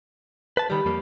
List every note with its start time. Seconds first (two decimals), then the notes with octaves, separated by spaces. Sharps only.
0.57 B4 A5
0.70 D#3 G3 G4 B5
0.85 F2 G3 A#3